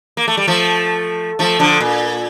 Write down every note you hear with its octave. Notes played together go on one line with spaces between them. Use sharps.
A#3
A3
G3
F3 A3
F3 A3
D3 F3
A#2